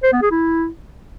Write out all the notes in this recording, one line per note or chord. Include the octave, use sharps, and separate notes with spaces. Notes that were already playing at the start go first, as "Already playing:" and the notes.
C5
B3
G#4
E4